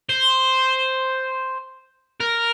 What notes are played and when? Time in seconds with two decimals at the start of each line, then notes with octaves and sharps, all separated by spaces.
0.09 C5
2.21 A#4